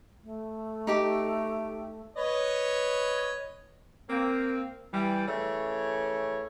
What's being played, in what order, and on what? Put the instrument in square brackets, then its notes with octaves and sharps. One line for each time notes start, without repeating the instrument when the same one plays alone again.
[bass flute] A3
[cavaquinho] D#4 G4 D6
[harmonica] B4 C#5 D#5
[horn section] A#3 C4
E3 G3
C#3 E3 A3 C#5